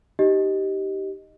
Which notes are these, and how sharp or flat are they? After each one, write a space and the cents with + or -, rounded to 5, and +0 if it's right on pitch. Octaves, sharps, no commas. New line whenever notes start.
D#4 +0 G4 -15 D#5 +0